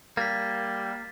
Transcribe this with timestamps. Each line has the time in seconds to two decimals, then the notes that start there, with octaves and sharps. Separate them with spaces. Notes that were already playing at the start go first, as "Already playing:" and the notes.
0.17 G3 A#3 A6 B6